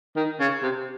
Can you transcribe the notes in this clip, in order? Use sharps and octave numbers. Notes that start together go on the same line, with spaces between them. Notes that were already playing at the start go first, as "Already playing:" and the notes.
D#3
C#3
C3